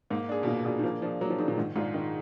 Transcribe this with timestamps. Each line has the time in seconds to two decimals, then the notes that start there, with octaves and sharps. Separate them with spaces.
0.10 G#2 A#3
0.29 D4 G#4
0.43 B2
0.47 A#2 A#3
0.65 B2 D4 G#4
0.79 D#3
0.83 F3 A#3
1.02 F3 D4
1.06 G#4
1.21 F#3 A#3
1.30 F3
1.38 D#3 D4 G#4
1.48 A#2
1.57 G#2 D#3
1.76 G#2 G#3 D4 F4 G#4
1.94 D#3